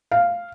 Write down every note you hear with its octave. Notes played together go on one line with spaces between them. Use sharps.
F5